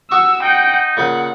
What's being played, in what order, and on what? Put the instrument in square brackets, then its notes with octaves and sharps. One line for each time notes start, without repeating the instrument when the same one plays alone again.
[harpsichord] F#4 C#6 D#6 [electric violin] E6
[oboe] D#4 [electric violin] F#5 G5
[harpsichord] A#2 C#3 B5 [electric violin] F#5